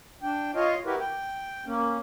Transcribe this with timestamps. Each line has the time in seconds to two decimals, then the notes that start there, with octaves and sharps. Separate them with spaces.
0.23 D4 G5
0.55 F4 C#5 D#5 F5
0.86 E4 F#4 G4 A#4 B4
1.00 G5
1.66 A#3 C#4